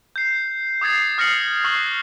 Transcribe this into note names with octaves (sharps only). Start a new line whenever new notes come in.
G6 C7
D6 D#6 G#6 A6 C7
D#6 F6 A#6 C7 C#7 F#7
C#6 E6 F#6 C7 F#7